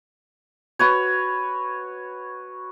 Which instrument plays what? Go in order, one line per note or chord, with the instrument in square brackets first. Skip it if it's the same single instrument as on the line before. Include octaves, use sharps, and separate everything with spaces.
[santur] F#4 B4 C#5